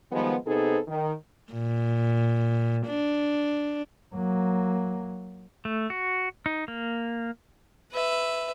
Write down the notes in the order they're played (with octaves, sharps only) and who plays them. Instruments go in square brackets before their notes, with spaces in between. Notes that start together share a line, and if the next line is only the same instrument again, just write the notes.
[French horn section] D#3 F3 G3 G#3 B3
C3 B3 D#4 G#4 A4 C5
D#3
[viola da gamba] A#2
D4
[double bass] F#3 A#3
[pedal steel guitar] A3
F#4
D#4
A#3
[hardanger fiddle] B4 E5